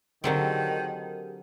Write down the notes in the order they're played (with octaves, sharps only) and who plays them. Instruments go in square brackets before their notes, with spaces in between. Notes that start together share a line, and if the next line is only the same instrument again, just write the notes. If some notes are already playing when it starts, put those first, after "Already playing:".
[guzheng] D3 F#3 C4 [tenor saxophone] D#3 [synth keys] G4 G#4 A#4